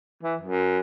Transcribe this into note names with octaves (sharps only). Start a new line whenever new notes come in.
E3
F#2